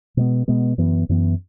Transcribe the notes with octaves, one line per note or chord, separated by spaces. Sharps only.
B2 G#3 B3
B2 G#3 B3
F#2 E3 B3
F#2 E3 B3